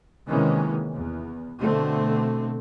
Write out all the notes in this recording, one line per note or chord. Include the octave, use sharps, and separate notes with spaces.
C3 D#3 E3 G#3 A#3 C#4
E2
B2 D3 A3 C4